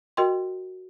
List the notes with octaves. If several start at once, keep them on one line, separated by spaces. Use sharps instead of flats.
F#4 A#4 D#5 G5 C6